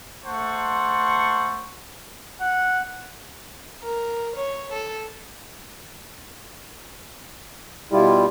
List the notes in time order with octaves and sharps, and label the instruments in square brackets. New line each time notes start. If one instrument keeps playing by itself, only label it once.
[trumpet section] A3 C5 F#5 A5 C6 C#6
[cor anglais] F#5
[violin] A#4
C#5
A4
[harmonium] B2 E4 F4 [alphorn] G3